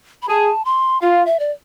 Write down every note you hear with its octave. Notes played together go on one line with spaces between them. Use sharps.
B5
G#4 A5
C6
F4 F5
E5
D5